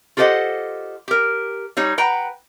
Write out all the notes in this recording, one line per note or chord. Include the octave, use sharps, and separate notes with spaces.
F4 G4 A4 C5 D#5 F#5
G4 A#4
G3 D#4 C#5
B4 F#5 G5 A#5